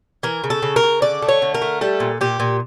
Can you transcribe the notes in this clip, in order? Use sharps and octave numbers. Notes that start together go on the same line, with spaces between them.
E3 A#4
C#3
A4
C#3
A#4
C#3
D3 D5
A3
C#5
D3
A#4
A3
G3 A4
A#2
A#2 G4
A#2